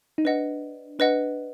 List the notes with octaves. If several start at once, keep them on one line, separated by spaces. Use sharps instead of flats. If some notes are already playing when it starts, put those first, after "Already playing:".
D#4
D4 B4 D#5 F#5
D4 B4 D#5 F#5